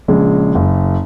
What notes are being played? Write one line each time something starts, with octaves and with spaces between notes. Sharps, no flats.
A#1 C#3 G#3
F#1